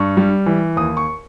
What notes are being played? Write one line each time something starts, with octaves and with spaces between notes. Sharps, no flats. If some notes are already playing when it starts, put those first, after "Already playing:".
Already playing: G2 C#6
G3
E3
D#2 D#6
C#6